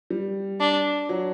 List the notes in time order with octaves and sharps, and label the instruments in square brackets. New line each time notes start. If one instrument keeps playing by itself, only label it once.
[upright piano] G3
[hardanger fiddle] D4
[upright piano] F#3